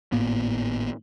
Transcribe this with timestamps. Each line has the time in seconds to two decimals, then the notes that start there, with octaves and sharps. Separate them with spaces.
0.12 G#1 A2 A#3 B3